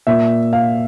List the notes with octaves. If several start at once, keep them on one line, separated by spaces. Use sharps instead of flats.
A#2 E5
F5